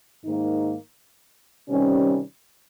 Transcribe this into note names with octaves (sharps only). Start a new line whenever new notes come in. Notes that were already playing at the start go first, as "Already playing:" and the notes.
G#2 D#3 A#3 D#4
C3 D#3 G3 C#4